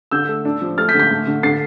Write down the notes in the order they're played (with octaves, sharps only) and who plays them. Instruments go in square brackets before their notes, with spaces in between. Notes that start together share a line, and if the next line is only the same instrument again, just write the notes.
[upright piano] D3 E6 G6
A3
D4
F3
A3 F6 A6
G6 B6
D3
G6 B6
A3
D3
D3 A6 C7